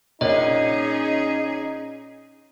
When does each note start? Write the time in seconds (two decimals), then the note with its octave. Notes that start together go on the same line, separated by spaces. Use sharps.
0.21 A#1 C#4 D#4 G#4 C#5 D#5